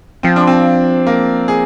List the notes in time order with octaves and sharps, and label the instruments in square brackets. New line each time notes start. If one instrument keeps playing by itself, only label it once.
[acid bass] F3 [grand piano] C4
[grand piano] D4
C4
A#3
G#4